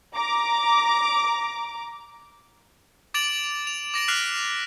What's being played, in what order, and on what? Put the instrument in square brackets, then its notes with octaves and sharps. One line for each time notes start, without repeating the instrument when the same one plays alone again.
[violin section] A#5 D6
[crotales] D6 A6 D7 F7 F#7
F7
D6 A#6 D7 F#7
D6 F6 F#6 B6 C7 F7